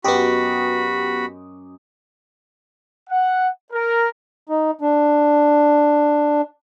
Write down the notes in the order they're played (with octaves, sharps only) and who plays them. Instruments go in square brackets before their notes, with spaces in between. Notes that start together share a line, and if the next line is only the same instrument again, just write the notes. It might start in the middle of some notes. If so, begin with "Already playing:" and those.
[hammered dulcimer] F#2 D#5 D6 [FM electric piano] B3 G4 [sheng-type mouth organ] F#4 B5
[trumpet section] F#5
A#4
[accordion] D#4
D4